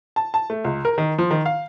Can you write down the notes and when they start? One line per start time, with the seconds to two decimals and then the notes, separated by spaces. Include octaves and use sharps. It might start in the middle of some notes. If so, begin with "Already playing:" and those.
0.16 A5
0.34 A5
0.50 A3
0.65 C#2
0.85 A#4
0.98 D#3
1.18 F3
1.31 D#3
1.46 F5